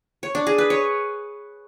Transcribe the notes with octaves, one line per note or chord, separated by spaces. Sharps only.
C#5
D4
G#4
B4
C#5